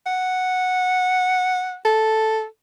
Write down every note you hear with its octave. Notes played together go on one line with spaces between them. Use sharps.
F#5
A4